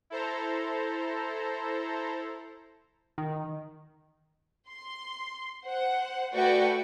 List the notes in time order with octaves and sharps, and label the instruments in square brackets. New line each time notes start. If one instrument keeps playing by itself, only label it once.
[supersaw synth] E4 A4 C5 A#5
[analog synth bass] D#3
[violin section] C6
C5 F#5
A3 F#4 B4 D5 G5 C#6